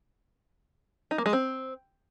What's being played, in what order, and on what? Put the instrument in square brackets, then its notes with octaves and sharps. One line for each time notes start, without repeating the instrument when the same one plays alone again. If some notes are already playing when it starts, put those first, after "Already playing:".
[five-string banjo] D#4
A#3
G#3
C4